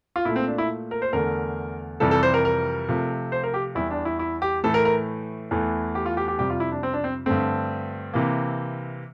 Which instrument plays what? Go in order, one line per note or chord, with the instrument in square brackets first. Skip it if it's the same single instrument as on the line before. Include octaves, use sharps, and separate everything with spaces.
[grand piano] F4
A#2 E4
A3
C4
D4
E4
A#4
C5
E2 D3 A3 A#4
F2 C3 E3 G3 A4
A4
C5
A#4
A#4
C3 F3 A3
C5
A#4
G4
E2 E3 G3 E4
D4
E4
E4
G4
A2 E3 A3 A4
A#4
A#4
E2 E3 A3
G4
F4
G4
G4
F2 C3 G3 G4
F4
E4
D4
C4
D4
C4
G2 D3 A3 C4
C3 E3 A#3